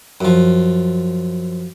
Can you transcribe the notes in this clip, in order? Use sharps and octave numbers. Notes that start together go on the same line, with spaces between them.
F#2 F3